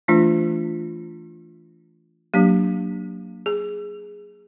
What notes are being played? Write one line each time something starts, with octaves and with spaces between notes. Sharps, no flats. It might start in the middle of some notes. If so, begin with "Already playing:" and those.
E3 A3 D4 F4
F#3 A#3 D4 G4
G#4